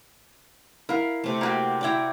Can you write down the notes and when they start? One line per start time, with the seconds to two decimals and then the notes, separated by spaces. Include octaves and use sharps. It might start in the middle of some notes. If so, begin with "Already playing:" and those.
0.89 E4 A#4 F5
1.24 C3 A3
1.41 A#3 F#4 G4
1.81 E4 F#4 D5 G5 A#5